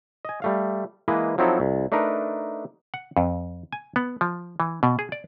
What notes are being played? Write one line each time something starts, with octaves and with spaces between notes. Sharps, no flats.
D#5 G#5
G3 A3 F5
E3 G#3 A#3 B4 D#5
F3 F#3 C4 D#4 E4 A4
C2
A3 D4 D#4 A#4 B4
F#5
F2
G#5
B3
F3
E3
B2
G#4
D5